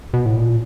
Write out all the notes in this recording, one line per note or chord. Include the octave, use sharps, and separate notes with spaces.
B2
A2
A#2